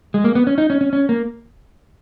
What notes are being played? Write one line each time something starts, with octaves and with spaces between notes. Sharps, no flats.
G#3
A#3
B3
C#4
D#4
C#4
C#4
C#4
A#3